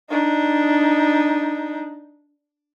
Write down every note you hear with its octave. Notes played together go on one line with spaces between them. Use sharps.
D4 D#4